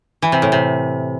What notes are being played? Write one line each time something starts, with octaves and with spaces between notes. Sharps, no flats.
E3
C3
A2
C3